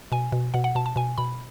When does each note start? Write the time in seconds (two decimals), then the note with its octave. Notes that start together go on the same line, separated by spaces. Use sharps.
0.12 B2 G#5
0.32 B2
0.54 B2 F#5
0.64 F#5
0.75 B2 A5
0.86 A5
0.96 B2 G#5
1.18 B2 B5